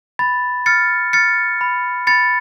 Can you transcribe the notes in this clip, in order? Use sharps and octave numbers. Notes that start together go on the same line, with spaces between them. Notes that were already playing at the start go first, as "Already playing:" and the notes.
B5 A6
F6 A6 C#7
F6 A6 C#7
B5
B5 A6 C#7